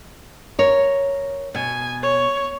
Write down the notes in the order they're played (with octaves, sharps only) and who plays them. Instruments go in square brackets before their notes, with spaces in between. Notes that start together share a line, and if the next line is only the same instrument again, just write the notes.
[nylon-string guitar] A#4 C#5
[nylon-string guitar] B2 [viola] G#5
[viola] C#5